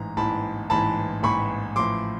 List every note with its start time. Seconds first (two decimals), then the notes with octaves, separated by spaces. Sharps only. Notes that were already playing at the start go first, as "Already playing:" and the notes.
Already playing: A1 G#2 E3 A#5
0.17 A1 G#2 E3 A5 B5
0.70 A1 G#2 E3 A5 B5
1.23 A1 G#2 E3 B5 C#6
1.76 A1 A2 F3 C6 D6